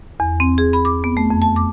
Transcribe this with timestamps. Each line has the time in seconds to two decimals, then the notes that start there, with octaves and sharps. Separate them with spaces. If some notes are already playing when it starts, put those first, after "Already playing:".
0.20 E2
0.40 C4
0.58 G#4
0.73 B5
0.85 D6
1.04 B3
1.17 A3
1.30 F2
1.42 A5
1.56 D6